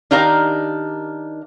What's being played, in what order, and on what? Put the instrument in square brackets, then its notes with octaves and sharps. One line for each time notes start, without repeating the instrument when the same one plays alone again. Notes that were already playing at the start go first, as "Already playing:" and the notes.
[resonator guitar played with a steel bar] D#3 D4 D#4 G4 A#4 F5